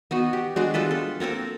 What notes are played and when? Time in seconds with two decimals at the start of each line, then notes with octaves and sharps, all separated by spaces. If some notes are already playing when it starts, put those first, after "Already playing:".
0.11 B3 D#4 F#4
0.33 G4
0.56 G#3 D4 F#4
0.74 G3 F4 A4 B4
0.91 A4
1.20 A#3 C4 A4 A#4